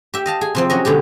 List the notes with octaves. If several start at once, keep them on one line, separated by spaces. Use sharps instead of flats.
G4 E5
D#5 F5 A5
G#4
C3 F3 C4
F#3 C#4 D#5
B2 D3 G#3 G4